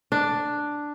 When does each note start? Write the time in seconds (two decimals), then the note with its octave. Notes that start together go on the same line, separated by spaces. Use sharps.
0.12 D4